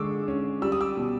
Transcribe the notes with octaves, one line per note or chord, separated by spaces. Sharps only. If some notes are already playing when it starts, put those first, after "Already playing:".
Already playing: D3 G#3 C#6 D6 E6
C#4
G3 E6
D#6
D6 E6
B2